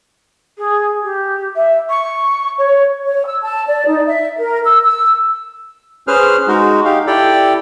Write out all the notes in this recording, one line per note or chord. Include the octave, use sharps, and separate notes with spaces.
G#4
G4
E5
C#6
C#5
C#5
E6
A5
D5
D#4
E5
A#4
E6
E6
C#4 G#4 B4 C5 F6
G#3 D#4 F#4
D#4 G4 F5
E4 G4 A4 D5 G5